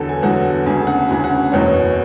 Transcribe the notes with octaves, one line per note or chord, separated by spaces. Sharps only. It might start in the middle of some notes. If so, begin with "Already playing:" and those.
Already playing: E2 D3 F#3 A4
G#5
E2 D3 F#3 F#5
E1 D2 C#3 G#5
F#5
E1 D2 C#3 G#5
F#5
F#1 E2 B2 C#5